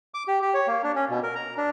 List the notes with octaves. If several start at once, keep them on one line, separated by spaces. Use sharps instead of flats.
D6
G4
G4
C#5
A#3
D4
C#4
B2
A#4
A#5
D4